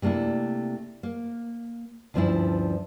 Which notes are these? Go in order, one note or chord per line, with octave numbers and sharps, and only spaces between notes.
C3 A3 A#3 D4 E4
A#3
D2 G2 F3 C#4 D4 E4